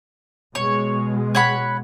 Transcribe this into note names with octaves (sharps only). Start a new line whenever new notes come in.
B2 G#3 C#5
C#5 F#5 B5